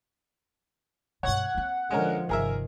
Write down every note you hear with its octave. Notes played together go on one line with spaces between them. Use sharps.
G2 B2 C#5 F#5 C#6
A#3 C4
D3 F3 G#3 C#4 A#4
G1 C3 D#3 G#4 A#4 E5